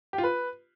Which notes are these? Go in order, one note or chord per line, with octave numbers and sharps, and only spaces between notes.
G4
F4
B4